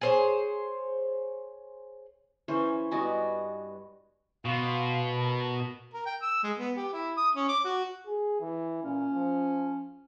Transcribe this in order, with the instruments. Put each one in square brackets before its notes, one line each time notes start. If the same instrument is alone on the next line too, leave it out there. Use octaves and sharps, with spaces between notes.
[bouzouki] G#4 C5 C#5
[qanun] E3 C#4 C5
[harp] G2 D#5 G#5 [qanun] B3 F#4 D5
[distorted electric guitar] B2 [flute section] B4 F5 C6
[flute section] A#4 A5 D#6
[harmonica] A#4
G5
E6
G#3
B3
G4
E4
D#6
C#4
D6
F#4
[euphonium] G#4
E3
[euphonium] A#2 [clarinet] C#4
[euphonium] F3